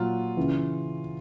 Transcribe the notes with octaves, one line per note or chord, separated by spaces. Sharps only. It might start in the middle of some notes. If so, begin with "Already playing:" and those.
Already playing: A#2 F#3 F4
C#3 E3